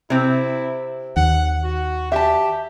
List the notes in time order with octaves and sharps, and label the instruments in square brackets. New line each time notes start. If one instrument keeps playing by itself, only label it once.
[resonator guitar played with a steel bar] C3 C4 [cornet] E4
[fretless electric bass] D#2 [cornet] F#5
[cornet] F#4
[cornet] G4 [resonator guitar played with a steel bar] E5 A5